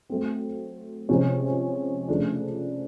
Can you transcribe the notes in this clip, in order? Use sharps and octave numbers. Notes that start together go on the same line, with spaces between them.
F#3 A3 C4
C3 F3 G#3 C#4
C#3 F3 A3 D4